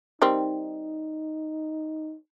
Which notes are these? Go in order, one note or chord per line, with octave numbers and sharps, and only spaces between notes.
D#3 G3 C4 D#4